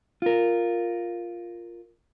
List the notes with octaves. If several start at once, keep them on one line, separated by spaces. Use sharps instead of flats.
F4 A#4